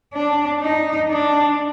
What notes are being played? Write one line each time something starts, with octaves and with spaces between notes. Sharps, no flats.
D4
D#4
D4